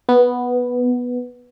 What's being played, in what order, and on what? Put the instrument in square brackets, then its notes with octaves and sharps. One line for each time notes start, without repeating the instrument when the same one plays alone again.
[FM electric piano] B3